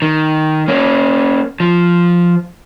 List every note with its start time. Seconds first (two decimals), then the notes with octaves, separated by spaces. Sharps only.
0.02 D#3
0.68 A#3 C#4
1.60 F3